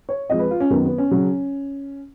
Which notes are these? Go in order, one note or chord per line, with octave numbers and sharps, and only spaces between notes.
C#5
F2 F3 G#3 D#5
B4
F4
C#4
F#2 D#3 F#3 B3
B3
C#4
C#3 F#3